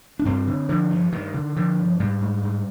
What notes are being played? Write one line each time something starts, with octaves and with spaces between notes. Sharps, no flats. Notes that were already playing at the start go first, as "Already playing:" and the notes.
D4
G2 C4
D3
D3 F3
G2
G2 D#3
D3
D3 F3
G2
G#2 G3
G#2
G#2